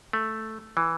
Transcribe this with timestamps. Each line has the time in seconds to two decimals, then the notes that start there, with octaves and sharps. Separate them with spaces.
0.13 A3
0.77 E3